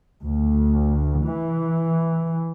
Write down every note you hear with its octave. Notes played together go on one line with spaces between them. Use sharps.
D2
E3